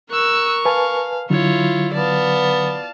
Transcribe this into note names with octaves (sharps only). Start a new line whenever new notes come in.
A#4 C#6 E6 F#6
B4 F5 G#5 A5
D3 F#3 E4 F4 C#5
B3 D5 F5 A5